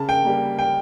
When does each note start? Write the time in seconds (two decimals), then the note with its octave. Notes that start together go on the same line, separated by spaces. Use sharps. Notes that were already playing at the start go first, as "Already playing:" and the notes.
Already playing: C#3 A5
0.09 G5
0.24 G3 A#3
0.59 G5